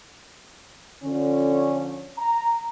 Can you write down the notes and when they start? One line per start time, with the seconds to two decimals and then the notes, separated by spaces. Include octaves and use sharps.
1.04 D3 F3 C#4
2.18 A#5